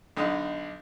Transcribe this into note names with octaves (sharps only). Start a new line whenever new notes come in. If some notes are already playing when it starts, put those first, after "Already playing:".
B1 D3 D#4 D#6